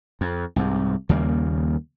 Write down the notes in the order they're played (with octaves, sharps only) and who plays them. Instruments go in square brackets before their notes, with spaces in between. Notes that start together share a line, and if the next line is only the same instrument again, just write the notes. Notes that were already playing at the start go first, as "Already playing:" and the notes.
[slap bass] F2
C2 G#2
D#2 C#3 G3 A#3